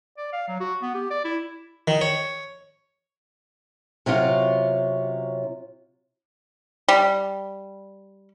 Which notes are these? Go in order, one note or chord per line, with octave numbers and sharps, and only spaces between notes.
D5
F5
F#3
F#4
B3
G4
D5
E4
D#3
C#5
C3 F#3 C#4 F4
G3